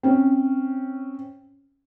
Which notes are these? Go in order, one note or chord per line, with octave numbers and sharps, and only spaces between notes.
C4 C#4